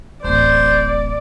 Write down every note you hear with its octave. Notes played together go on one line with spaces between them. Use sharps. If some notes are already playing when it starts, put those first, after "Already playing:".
D1 A1 C5 D5